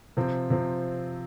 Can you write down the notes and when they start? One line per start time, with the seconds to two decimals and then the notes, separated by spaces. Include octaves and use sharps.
0.17 C3 F3 C4
0.50 C3 F3 C4